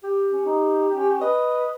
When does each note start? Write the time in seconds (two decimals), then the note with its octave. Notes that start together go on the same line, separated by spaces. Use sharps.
0.03 G4
0.31 C#4
0.45 D#4
0.92 C#4
1.21 B4 D#5